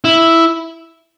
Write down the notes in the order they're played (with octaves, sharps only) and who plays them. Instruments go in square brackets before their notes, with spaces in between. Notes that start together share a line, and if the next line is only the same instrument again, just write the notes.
[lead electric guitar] E4